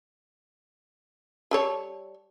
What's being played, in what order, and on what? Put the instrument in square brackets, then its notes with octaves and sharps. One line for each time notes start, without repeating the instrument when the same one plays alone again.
[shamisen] G3 A4 C#5